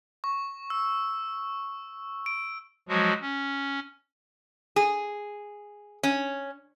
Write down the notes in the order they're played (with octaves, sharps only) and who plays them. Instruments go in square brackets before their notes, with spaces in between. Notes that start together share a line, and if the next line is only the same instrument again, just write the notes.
[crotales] C#6
E6
D7
[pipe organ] F3 F#3 G#3 F#4
C#4
[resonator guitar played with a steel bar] G#4
C#4